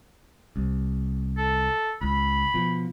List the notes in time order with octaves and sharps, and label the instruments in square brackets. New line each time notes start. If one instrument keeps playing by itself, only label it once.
[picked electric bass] C2
[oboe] A4
[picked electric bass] C#2 [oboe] B5
[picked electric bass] B2 F3